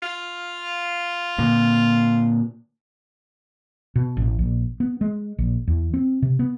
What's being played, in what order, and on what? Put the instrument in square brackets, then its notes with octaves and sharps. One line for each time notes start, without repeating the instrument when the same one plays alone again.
[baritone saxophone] F4
[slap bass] A#2 D3 A#3
[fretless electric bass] B2
A1
A#1
B3
G#3
A#1
E2
C4
C3
B3